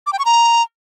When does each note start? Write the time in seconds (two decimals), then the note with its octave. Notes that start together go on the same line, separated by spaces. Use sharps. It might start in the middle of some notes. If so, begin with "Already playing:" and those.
0.07 D6
0.13 G5
0.19 C#6
0.25 A#5